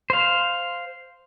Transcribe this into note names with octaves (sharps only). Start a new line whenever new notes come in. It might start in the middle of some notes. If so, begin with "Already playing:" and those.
C5 F5